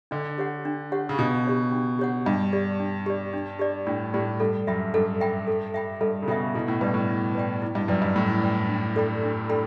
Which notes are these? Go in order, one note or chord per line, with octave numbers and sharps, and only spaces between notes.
D3 D4
G4 C#5 F#5
D4
G4 C#5 F#5
C#3
B2 D4
G4 C#5 F#5
D4
G4 C#5 F#5
G2 D4
G4 D5
D4
G4 D5
D4
G4 D5
A2 D4
A2 G4 D5
G2 A4
F#2 E5 G5 B5
G2 A4
E5 G5 B5
A4
E5 G5 B5
G2 A4
C#3
B2 E5 G5 B5
B2 E4
A2
G2 B4 D5 G5
A2
E4
B4 D5 G5
E4
G2
F#2 B4 D5 G5
G2
A2 E4
B4 D5 G5
D4
A4 D5 G5 B5
D4
A4 D5 G5 B5